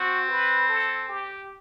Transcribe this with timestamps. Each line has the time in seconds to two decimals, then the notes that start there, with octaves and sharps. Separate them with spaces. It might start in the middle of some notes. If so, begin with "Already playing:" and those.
Already playing: C4 F#4
0.29 B4
0.69 A4
1.08 G4